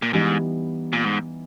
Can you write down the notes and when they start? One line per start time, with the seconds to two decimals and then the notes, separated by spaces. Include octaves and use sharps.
0.02 A#2
0.13 G#2 E3 G3 B3 D#4
0.93 A#2
1.05 G#2